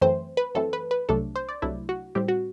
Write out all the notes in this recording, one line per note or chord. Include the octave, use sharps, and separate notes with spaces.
F#2 E3 A3 C4 C5
B4
F#2 E3 A3 C4 A4
B4
B4
C2 C3 F#3 A3 D4 A4
C5
D5
C2 C3 F#3 A3 D4 E4
F#4
A2 G3 C4 G4
F#4